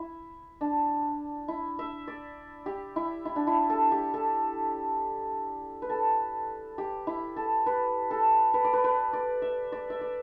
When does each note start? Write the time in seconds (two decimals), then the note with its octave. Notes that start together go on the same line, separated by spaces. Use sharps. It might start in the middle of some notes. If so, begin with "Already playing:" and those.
Already playing: E4
0.61 D4
1.48 E4
1.79 E5
2.08 D5
2.66 G4
2.96 E4
3.25 E4
3.36 D4
3.47 E4
3.70 A4
3.92 G4
4.14 A4
5.82 B4
5.90 A4
6.78 G4
7.07 E4
7.36 A4
7.66 B4
8.11 A4
8.54 B4
8.65 D5
8.73 B4
8.84 B4
9.13 D5
9.42 E5
9.72 D5
9.90 E5
10.01 D5